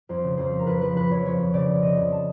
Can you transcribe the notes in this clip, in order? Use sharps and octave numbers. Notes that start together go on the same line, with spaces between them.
F2 C5
C#3
F2 C5
F3
A#4
F2 B4
F3 B4
F2 B4
F2 C#5
F3 C#5
F2
C#3 D5
F2
C#3 D#5
F2
A5